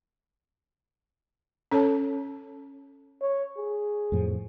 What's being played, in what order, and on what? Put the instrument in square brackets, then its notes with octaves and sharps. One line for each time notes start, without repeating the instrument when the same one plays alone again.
[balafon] C#4 A4 C#5 A5
[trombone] C#5
G#4
[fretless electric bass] F2 A2 F3